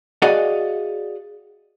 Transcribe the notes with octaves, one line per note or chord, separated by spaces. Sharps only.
F#4 G#4 D5 D#5 F5 F#5